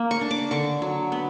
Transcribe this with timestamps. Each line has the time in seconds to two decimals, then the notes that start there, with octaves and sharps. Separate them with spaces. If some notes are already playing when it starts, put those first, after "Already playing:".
Already playing: A#3
0.11 C#6
0.21 D4
0.31 D6
0.51 D3 C#6
0.82 F#3
1.12 B3